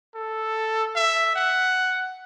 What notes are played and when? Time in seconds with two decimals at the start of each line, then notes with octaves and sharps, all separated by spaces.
0.15 A4
0.96 E5
1.36 F#5